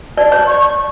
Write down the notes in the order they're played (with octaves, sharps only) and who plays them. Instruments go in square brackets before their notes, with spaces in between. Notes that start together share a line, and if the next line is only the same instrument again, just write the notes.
[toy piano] D5 [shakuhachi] A5
[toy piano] C#5
[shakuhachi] C#6
C#6